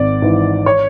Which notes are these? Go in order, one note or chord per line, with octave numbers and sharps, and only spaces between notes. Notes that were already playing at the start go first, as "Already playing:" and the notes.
Already playing: G#1 D5
G#2 E3
C#5